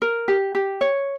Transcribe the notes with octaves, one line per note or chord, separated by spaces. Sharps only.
A#4
G4
G4
C#5